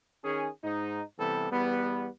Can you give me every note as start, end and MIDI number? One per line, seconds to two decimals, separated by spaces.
0.24 0.48 51
0.24 0.48 61
0.24 0.48 68
0.63 1.01 44
0.63 1.01 63
1.18 1.51 48
1.18 1.51 52
1.18 1.51 55
1.18 1.51 59
1.18 1.51 69
1.52 2.07 40
1.52 2.07 55
1.52 2.07 59